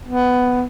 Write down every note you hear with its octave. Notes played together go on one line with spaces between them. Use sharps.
B3